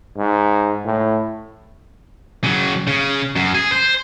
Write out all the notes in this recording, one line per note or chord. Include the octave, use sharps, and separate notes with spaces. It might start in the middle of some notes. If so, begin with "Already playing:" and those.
G#2
A2
C#3 F#3
C#3
F#2
G#4
C5